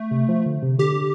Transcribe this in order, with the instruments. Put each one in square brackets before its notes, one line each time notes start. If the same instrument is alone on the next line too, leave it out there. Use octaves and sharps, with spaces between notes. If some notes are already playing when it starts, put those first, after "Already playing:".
Already playing: [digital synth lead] A3
[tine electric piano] C3
F3
D3
C3
[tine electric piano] D3 [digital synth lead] G4